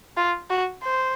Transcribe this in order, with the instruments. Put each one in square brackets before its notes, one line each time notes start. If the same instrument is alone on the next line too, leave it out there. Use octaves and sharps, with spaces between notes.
[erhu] F4
F#4
C5